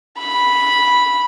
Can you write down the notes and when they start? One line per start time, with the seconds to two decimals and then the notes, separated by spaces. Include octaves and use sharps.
0.19 B5